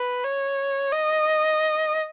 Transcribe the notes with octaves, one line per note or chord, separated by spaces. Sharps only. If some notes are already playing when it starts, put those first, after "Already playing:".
Already playing: B4
C#5
D#5